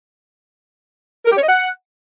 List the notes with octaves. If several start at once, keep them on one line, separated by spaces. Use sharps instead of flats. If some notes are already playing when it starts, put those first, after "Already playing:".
A#4
G4
C#5
D#5
F#5